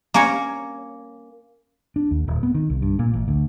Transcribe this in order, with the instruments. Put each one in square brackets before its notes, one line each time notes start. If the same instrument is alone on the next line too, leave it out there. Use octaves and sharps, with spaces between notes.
[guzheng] A#3 C#4 A#4 C#5
[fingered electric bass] D4
D#2
D#1
B3
D#3
C2
G2
A#2
A1
D2